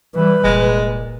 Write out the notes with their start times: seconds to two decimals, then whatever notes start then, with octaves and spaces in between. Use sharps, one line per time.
0.14 E3 G3 B4
0.44 F1 A#2 G#3